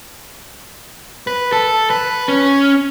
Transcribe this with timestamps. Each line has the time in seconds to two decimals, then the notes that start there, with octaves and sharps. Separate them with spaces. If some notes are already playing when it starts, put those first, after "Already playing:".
1.27 B4
1.52 A4
1.90 B4
2.28 C#4